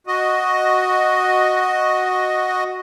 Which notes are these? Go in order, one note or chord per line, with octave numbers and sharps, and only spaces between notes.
F#4 D#5